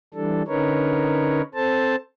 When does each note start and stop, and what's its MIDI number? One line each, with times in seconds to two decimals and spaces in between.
0.14 0.43 52
0.14 0.43 55
0.14 0.43 62
0.14 0.43 69
0.48 1.42 50
0.48 1.42 61
0.48 1.42 63
0.48 1.42 70
0.48 1.42 71
0.48 1.42 73
1.55 1.96 60
1.55 1.96 69
1.55 1.96 72
1.55 1.96 81